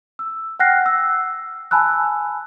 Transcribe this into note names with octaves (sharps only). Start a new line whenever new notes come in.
E6
F#5 G5 F6 F#6 A#6 C7
E6
G#5 A5 B5 E6 F#6